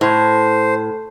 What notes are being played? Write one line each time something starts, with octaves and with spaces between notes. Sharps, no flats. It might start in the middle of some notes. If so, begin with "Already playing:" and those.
A2 C5